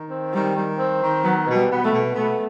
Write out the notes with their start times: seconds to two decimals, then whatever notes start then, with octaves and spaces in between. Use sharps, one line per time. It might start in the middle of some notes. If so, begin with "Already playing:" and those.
Already playing: D#3
0.11 C4
0.34 D#3 G3
0.56 D#3
0.79 C4
1.02 D#3
1.24 F#3 B3
1.47 B2
1.55 G3
1.70 B3
1.85 A3
1.93 B2
2.15 A3 B3